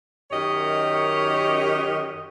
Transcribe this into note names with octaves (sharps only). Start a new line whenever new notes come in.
F#2 D#3 G4 C#5 D#5